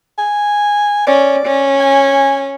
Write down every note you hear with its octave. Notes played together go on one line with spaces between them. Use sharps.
G#5
C#4 D5
C#4
G#5